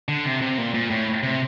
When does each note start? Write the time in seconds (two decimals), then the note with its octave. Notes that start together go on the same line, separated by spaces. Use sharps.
0.08 D3
0.25 C3
0.42 C3
0.58 A#2
0.74 A#2
0.90 A2
1.23 C3